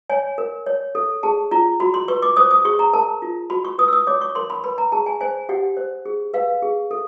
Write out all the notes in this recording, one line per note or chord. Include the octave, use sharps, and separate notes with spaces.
C#5 G#5
A#4
C#5
A4
G#4 A5
F4 A#5
F#4 B5
C6
B4 C#6
D6
C5 D#6
D#6
G#4 C#6
A#5
A#4 A5
F4
F#4 B5
C#6
B4 D#6
E6
D#6
C#5 D6
C#6
A#4 C6
B5
B4 B5
A#5
G#4 A5
G#5
C5 G#5
G4 F#5
C5
G#4
B4 F5
G#4
A4